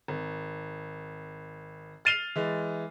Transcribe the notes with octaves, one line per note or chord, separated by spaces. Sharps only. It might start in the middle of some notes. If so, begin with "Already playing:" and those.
G#1
F6 A6 C7 D#7 F7 G7
E3 G#3